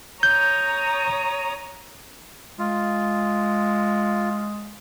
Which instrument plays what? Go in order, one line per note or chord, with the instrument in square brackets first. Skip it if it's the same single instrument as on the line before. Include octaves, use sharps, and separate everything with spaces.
[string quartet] C#5 A#5 D#6 [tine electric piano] G6
[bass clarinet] G#3 [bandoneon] F4